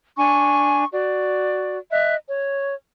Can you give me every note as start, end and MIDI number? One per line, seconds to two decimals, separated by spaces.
0.17 0.84 62
0.17 0.84 80
0.17 0.84 85
0.94 1.79 66
0.94 1.79 74
1.91 2.15 75
1.91 2.15 76
1.91 2.15 90
2.27 2.75 73